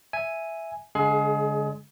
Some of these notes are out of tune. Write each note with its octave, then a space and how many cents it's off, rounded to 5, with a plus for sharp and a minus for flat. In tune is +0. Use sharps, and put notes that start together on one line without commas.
E5 +0 G#5 +0
D3 -45 G#3 +0 G#4 +30